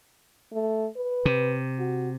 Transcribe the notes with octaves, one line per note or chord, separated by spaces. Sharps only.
A3
B4
C3
F#4